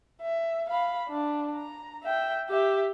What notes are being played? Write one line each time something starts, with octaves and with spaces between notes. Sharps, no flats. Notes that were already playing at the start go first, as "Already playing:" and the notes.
E5
F5 B5
D4
A#5
E5 G5
G4 E5